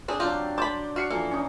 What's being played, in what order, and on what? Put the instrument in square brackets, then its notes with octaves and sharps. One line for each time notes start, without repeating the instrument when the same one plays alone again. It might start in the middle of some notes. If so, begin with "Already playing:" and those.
[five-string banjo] C4 D4 G#4
[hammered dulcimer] F#3 D4 [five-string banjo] C4 F4 G4
[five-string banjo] A5 B5 [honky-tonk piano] C6 D6 G6
[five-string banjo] F#4 [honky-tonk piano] F6 C7 C#7
[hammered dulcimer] E3 [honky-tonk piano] F3 A4 [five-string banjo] A#3
[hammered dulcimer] C#4 D#4